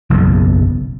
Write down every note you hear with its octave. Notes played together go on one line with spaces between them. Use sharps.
F#1 B1 E2